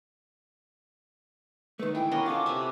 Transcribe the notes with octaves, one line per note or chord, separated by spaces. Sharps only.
D#3 A3 B4
E3 G5
B3 C#4 D4 A#4 D#5
F4 A4 D6
C3 B4 E5